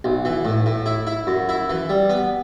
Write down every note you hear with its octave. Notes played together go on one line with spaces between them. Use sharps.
B1
E3
A2
A2
E4
E4
F#2
E4
E3
G3
B3